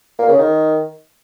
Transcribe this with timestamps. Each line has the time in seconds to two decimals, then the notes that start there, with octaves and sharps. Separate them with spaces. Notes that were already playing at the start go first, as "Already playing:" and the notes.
0.19 A#3
0.28 C#3
0.38 D#3